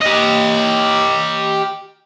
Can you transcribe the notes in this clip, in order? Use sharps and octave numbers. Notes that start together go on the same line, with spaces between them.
G4 D#5